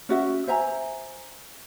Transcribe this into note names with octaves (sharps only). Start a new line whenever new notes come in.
C#4 F#4 E5
C5 E5 G#5 A#5